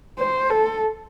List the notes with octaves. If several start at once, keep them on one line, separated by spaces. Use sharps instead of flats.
C5
A4